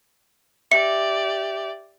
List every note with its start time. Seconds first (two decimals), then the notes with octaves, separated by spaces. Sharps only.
0.72 G4 D5 E5 C#7